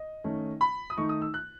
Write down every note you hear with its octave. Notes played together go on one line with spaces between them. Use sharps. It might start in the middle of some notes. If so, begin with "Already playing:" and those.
Already playing: D#5
D#3 A3 C#4
B5
D#6
D#3 A3 D#4 C#6
D#6
E6
F#6